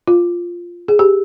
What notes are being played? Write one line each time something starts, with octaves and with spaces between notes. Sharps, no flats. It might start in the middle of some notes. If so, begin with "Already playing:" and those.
F4
G#4
G4